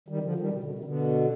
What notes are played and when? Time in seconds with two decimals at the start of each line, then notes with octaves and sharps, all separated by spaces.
0.08 D#3 G3
0.23 D3 F3
0.38 D#3 G3
0.53 B2 D3
0.63 B2 D3
0.74 C3
0.79 D#3
0.84 B2 D3